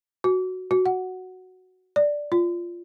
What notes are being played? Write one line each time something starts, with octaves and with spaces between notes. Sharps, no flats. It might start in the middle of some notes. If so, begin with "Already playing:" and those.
F#4
F#4
F#5
D5
F4